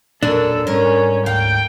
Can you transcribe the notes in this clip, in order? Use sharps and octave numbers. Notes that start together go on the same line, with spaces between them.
E1 F#2 A#2 D4 A4
G#2 G3 C#4 A#4
D2 G#2 F5 G5